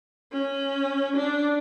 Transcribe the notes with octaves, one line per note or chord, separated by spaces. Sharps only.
C#4
D4